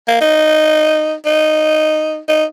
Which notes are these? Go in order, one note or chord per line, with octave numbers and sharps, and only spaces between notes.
A#3
D#4
D#4
D#4